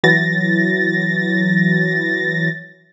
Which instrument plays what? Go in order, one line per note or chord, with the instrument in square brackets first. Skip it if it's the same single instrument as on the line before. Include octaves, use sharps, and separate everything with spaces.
[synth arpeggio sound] E3 F#3 A6 A#6